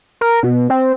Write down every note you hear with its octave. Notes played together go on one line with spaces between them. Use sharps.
A#4
B2
C4